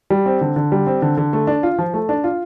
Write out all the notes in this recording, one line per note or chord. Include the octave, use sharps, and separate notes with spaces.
G3
C4
D3
D3
G3
C4
D3
D3
A3
D4
F4
F3
A3
D4
F4